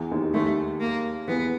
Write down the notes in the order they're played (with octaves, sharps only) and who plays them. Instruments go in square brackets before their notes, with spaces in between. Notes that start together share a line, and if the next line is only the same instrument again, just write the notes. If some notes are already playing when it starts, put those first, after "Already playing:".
Already playing: [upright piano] E2 E3
D#2 D#3
[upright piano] D#2 D#3 [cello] A3
[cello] A#3
[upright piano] E2 E3 [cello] B3